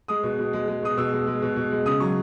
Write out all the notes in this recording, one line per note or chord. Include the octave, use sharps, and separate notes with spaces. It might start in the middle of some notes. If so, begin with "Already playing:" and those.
G#3 D#6
B2
B2
G#3
G#3
B2 D#6
B2 E6
G#3
G#3
B2
B2
G#3
C#3 D#6
F#3 C#6